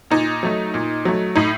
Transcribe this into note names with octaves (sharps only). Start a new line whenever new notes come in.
A#2 D#4
F#3 A3
A#2
F#3 A3
A2 D#4